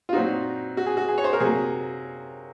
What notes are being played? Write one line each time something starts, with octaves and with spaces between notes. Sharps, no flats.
F4
A#2 F#3 C4 D#4 F#4
F#4
G#4
F#4
G#4
C#5
C5
A#4
C3 F#3 A#3 G#4